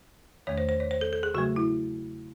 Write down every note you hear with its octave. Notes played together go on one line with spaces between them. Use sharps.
E2 D#3 A3 C#5
C5
C5
C#5
C5
A4
A4
G#4
C#3 F#3 A3 F#4
E4